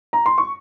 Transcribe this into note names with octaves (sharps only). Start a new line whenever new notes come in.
A#5
C6
C#6